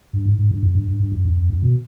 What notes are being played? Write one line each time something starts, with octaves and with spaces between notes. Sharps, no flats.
G2
G#2
G#2
G2
F#2
G2
G2
G2
F#2
F2
F2
F#2
B2